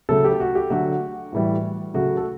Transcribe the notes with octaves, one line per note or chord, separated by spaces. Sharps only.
C#3 F#3 A3 A4
G4
F#4
G4
D3 F#3 A3 F#4
A2 E3 G3
C#3 F#3 A3 F#4
A4